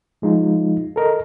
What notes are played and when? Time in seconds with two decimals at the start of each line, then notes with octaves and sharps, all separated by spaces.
0.22 F3 G#3 D#4 F4
0.96 A4 A#4 D#5